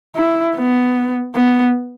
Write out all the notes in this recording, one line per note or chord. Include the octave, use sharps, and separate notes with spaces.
E4
B3
B3